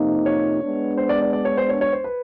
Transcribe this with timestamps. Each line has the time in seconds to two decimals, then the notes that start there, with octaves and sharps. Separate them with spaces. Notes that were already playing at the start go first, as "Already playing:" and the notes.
Already playing: F2 C3 F3 A#3 D#4
0.26 C#5
0.62 G#3 B3 D4
0.98 C5
1.09 D5
1.22 D5
1.33 D5
1.45 C#5
1.58 C5
1.69 C#5
1.81 C#5
1.93 C5
2.04 B4